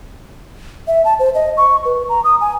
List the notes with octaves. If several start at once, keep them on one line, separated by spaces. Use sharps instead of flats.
E5
A5
C5
D#5
C#6
B4
A#5
D#6
G#5